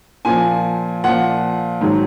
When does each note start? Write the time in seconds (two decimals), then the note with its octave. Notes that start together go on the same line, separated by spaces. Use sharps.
0.25 A#2 F3 G#5
1.04 A#2 F3 F#5
1.81 G#2 D#3 F#3